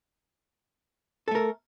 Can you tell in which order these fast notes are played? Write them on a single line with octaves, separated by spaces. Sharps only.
A4 A3 A#4